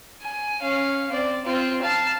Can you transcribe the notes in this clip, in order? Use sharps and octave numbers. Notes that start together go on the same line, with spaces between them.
G#5
C#4 F5
C4 D5
C4 F4
F5 A5